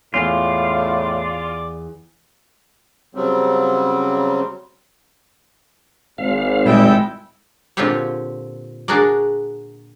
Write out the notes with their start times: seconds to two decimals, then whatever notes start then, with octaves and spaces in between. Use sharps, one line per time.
0.14 E2 A2 F4 D5 F5
3.15 C#3 F#3 G3 C4
6.18 G#1 F5
6.65 A#2 G3 G#3 E4 A4 G5
7.77 A#2 D3 C4 F4 G4 C#5
8.88 D4 F#4 G#4 A#4 D5